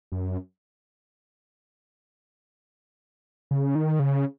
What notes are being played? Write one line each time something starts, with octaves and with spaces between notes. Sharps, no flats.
F#2
C#3
D#3
C#3